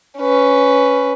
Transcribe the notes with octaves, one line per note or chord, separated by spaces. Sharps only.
C#4 B4